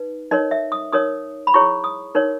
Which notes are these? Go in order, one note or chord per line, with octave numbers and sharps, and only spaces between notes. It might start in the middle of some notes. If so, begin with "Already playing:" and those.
Already playing: D#4 B4
D#4 A#4 C#5 D#5
E5
D#6
D#4 A#4 C#5 D#6
B5
E4 G#4 C#5 C#6
D#6
D#4 A#4 C#5